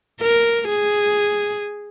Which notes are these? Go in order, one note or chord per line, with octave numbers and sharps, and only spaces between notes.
A#4
G#4